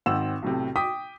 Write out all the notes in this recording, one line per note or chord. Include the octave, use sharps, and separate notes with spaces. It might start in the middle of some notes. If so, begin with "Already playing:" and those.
G#1 D#3 C4 F#5 E6 E7
B1 A2 C3
G5 D6 D#6 B6